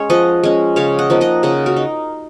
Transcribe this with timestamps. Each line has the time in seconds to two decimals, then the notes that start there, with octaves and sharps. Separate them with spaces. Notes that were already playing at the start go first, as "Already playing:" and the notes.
Already playing: G#3 C#4 C#5
0.10 F3 D#5 F#5
0.43 G#3 C#4
0.76 C#3 C#5 F5
0.99 D#5 F#5
1.10 F3 A#3 D#4
1.21 D#5 F#5
1.43 C#3 D#5 F#5
1.66 F#4 A#4
1.76 D#4